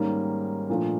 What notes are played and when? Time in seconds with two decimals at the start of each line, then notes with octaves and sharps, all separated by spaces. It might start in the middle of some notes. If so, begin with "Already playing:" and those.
Already playing: G#2 D#3 G3 A#3 C#4
0.69 A#2 F3 A3 D4